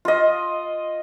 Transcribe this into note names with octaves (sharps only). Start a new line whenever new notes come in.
F4 D#5